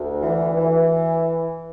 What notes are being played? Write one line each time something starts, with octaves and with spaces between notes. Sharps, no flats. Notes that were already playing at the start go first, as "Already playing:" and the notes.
Already playing: D2
E3
E3